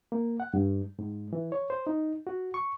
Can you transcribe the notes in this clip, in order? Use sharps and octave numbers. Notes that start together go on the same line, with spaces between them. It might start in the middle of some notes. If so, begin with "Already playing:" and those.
A#3
F#5
G2
G#2
E3
C#5
C5
D#4
F#4
C#6